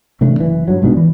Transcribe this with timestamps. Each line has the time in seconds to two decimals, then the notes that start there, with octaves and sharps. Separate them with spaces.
0.21 C3 E3 A3 D4
0.40 F#1 E3
0.68 G2 F#3
0.82 C2 G#2 B2 D4
0.97 E3